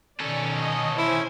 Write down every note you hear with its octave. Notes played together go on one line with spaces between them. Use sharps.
B2 D#3 C#4 A4 D5
D#5
E4 C5 G#5